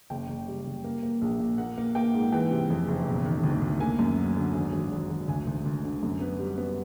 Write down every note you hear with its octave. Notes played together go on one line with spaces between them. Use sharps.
F#1 G5
F#1
G3
F#1
A#3
A#3
A#1
A#2
A#3 F#5
A#3
A#3 G5
G#2
E3 G5
C3
F2
F#1
E1
D#3
D2
D2
A#3 G#5
F#2
F#3
D3
G#1
G#1
G#1
G#1
D2 G#5
D2
D2
D3
F#2
B3
G3
B3